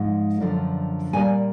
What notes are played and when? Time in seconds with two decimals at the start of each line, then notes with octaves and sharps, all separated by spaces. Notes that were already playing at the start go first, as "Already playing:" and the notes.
Already playing: G#2 F3 G#3
0.40 F#2 D3 F3
1.13 A#2 G3 A#3 G#5